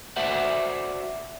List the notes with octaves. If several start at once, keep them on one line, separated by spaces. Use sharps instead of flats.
F#4 C5 D5 E5 F#5